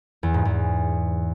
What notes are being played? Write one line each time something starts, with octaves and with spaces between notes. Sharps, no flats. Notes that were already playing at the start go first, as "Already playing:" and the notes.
E2
G#2
E2